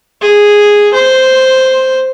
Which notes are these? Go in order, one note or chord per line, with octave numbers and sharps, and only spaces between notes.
G#4
C5